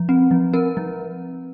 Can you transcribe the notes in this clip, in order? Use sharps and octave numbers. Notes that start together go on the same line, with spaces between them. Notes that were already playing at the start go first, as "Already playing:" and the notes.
Already playing: F3
C4
F3
C4 A#4
F3